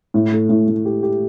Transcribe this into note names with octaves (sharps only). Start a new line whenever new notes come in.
A2
A3
A2
A2
G4
G4